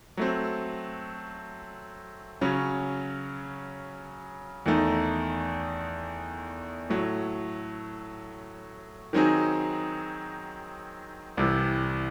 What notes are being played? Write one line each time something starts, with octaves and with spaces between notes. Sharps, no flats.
F#3 A3 C4
C#3 F#3 C#4
E2 D#3 A3 D#4
A2 F#3 A3
D#3 F#3 C4 D#4 G#4
C2 C3 E3